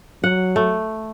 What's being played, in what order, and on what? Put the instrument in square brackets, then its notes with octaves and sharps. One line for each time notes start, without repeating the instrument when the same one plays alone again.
[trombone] F#3 [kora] F#5
[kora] A3